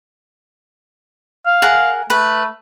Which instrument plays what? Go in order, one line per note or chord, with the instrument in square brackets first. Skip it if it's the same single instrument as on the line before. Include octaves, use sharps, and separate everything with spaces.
[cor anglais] F5
[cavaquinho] G#4 A#4 F#5
[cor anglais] A3 [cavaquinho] B4 B5